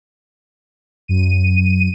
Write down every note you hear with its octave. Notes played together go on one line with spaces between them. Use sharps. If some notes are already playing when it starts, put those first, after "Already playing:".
F#2 D#7